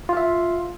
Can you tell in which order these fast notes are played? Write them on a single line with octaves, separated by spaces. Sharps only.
F4 F5 E5